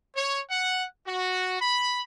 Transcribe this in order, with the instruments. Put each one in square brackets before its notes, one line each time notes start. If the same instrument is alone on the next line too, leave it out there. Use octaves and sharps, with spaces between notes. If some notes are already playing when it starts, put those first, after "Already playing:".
[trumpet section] C#5
F#5
F#4
B5